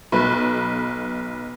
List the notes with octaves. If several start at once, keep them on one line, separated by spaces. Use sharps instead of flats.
B1 B4